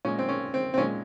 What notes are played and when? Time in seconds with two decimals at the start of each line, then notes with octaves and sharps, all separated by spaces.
0.05 A#2 G#3 C#4
0.19 C4
0.29 C#4
0.54 C4
0.74 C4
0.78 A#2 C#4
0.81 G#3